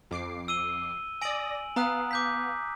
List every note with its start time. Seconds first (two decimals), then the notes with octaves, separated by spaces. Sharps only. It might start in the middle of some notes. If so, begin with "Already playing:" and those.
0.11 F2 D6 C7
0.48 E6 D#7 G7
1.22 D5 G#5 D#6 A#6 D7 F#7
1.76 B3 F5 A#5 D#6 F#6
2.11 D6 G6 B6